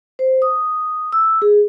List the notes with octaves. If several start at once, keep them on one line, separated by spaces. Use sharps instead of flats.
C5
D#6
E6
G#4